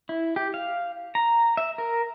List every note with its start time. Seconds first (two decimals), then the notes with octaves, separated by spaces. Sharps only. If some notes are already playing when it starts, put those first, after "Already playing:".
0.09 E4
0.36 G4
0.54 F5
1.15 A#5
1.57 E5
1.78 A#4